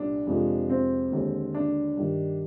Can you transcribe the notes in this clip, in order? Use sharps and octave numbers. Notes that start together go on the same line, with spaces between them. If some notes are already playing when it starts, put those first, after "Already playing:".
Already playing: C2 A#2 D4
F2 C3 F3 G#3
C4
D#2 D3 G#3
D4
G2 D#3 G3